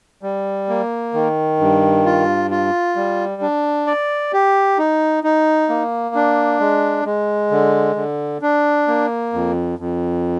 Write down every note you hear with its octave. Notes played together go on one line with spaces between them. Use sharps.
G3
A#3
D#3
G2
F4
F4
G3
D4
D5
G4
D#4
D#4
A#3
D4
G#3
G#3
D3
D3
D4
A#3
F2
F2